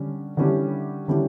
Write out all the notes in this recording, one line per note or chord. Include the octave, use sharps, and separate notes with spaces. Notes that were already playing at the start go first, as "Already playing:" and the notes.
Already playing: D3 G3 C#4
D3 G3 C#4 E4 G4
D3 G3 C#4 E4 G4